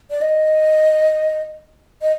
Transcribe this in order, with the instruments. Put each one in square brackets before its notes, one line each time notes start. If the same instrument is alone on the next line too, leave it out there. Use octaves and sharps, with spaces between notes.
[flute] D5
D#5
D#5